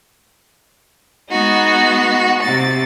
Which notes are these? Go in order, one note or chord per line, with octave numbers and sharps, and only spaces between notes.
G#3 B3 D#4 F#4
C3 A6